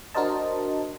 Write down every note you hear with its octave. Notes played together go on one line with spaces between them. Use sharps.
D4 F#4 A#4 C5 D#5 A5